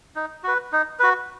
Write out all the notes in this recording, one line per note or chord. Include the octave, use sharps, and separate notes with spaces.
D#4
F#4 B4
D#4
F#4 B4